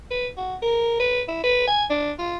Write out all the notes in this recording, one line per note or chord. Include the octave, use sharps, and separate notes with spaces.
B4
F#4
A#4
B4
E4
B4
G#5
D4
F4